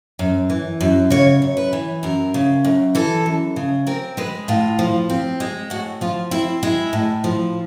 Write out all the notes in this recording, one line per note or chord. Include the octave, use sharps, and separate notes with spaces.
F#2
E3
F#2
C#3 C#5
F#2
B4
E3
F#2 A#4
C#3
F#2
E3 A4
F#2
C#3
C4 A#4
G#3 B4
A2 F4
F3
C4
G#3
A2 F#4
F3 F4
C4 E4
G#3 E4
A2
F3